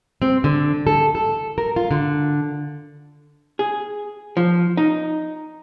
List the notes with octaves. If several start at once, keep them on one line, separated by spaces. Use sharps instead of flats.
C4
D3
A4
A4
A#4
F4
D3
G#4
F3
D#4